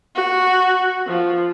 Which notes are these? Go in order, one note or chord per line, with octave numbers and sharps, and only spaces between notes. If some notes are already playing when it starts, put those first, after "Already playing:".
F#4
F3